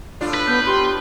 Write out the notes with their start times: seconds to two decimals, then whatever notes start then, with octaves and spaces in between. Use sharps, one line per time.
0.21 A2 D4 F4
0.34 B4
0.47 B3 G6
0.66 G4 C6